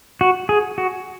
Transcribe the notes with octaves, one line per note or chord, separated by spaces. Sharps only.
F#4
G#4
F#4